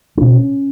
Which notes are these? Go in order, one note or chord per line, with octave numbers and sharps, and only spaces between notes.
D4
B2 C#4